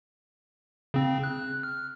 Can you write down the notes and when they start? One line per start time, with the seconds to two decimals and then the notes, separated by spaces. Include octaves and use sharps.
0.94 C#3 C4
1.24 F#6
1.63 F6